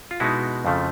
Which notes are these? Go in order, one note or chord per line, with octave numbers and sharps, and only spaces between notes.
F4
B2 G#3 B3 D#4 E4 F#4
F2 C#3 F3 A3